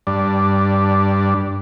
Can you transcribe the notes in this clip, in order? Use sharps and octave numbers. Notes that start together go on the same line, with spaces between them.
G2 D4